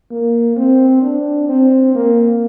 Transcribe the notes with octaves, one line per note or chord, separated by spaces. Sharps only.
A#3
C4
D4
C4
A#3